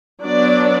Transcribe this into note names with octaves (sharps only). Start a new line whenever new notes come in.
F#3 B3 D4 D5